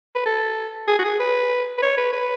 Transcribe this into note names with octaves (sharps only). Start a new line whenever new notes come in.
B4
A4
G#4
F#4
G#4
B4
B4
C#5
B4
B4